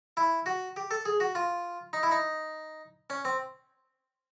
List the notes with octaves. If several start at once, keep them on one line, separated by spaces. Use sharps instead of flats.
E4
F#4
G4
A4
G#4
F#4
F4
D#4
E4
D#4
C#4
C4